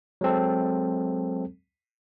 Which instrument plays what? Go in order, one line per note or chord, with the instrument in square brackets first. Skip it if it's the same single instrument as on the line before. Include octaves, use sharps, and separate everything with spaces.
[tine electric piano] F#3 G#3 C4 A4